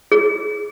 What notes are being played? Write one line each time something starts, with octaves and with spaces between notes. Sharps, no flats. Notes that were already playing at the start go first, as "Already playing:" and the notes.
G#4